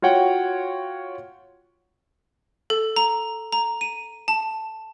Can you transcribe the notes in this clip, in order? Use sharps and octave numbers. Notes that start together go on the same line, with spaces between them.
F4 F#4 C#5 F#5 G5
A4
A#5
A#5
D#7
A5